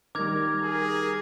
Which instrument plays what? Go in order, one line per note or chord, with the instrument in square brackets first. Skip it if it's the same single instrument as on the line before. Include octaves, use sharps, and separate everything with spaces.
[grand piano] D#3 G3 [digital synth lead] A#4 [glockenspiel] D6 G#6
[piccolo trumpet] G#4